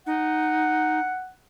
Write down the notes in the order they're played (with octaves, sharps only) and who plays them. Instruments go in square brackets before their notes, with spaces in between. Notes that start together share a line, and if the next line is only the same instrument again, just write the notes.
[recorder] D#4 [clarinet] F#5